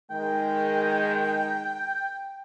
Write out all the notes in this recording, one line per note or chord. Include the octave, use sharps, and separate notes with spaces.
D#3 G#3 G5